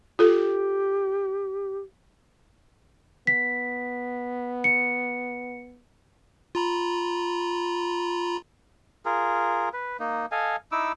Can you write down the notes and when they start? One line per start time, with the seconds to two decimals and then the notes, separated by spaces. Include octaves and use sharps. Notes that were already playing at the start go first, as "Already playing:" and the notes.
0.19 F4 G4 A4
3.27 B3 B6
4.64 C#7
6.55 F4 A#5 B5
9.06 F4 G#4 A#4
9.73 B4
9.99 A#3 D#4
10.32 A4 D#5 F5 G#5
10.72 D#4 E4 D6 E6